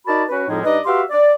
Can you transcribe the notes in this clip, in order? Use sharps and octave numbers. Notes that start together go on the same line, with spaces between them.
D#4 F#4 A#4 D5 A5 B5
C#4 F#4 B4
F2 A2 F3 G3 G#3 D#4
G2 D#4 B4 D5 D#5
F#4 G4 B4 E5 F5 C6
D5